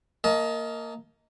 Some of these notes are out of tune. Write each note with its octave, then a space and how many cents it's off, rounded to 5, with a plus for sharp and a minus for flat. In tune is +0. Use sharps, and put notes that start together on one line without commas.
A#3 -15 D#5 +20 A5 -30